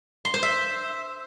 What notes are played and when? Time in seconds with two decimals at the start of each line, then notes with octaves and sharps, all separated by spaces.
0.25 C6
0.34 C5
0.43 E5